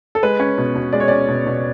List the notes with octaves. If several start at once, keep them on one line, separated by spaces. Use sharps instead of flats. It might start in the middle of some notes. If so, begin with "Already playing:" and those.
A4
G#3 B4
C#4
B2
B2
G#3 D5
C#5
C#4 D5
B2
B2